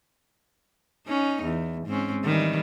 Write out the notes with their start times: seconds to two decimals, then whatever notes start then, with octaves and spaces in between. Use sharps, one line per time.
1.07 C#4 D#4
1.43 E2
1.87 G#2 C4 C#4
2.24 D#3 E3 G3